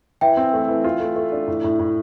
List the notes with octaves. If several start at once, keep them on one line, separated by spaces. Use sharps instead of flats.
E3 E5 G5
C4
A3
E3
F4
A3
A3
D4
A2
A2
A2